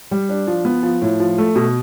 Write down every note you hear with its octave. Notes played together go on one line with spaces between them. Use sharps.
G3
D4
F3
B3
F3
A2
F3
A3
B2